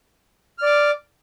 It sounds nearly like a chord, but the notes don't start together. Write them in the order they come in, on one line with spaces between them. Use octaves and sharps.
F6 D5 D6